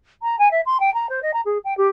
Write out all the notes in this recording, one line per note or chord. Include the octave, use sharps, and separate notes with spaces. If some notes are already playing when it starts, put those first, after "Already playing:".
A#5
G#5
E5
C6
G5
A#5
C5
D#5
A#5
G#4
G5
G4